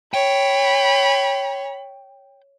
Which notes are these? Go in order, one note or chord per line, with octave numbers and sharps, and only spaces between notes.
C#5 G5 B5